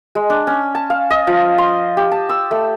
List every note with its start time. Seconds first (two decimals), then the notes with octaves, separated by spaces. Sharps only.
0.15 G#3
0.30 D4
0.47 C#4
0.75 A5
0.90 F5
1.10 D#5
1.27 F3
1.58 C6
1.97 G4
2.11 A5
2.29 E6
2.51 A3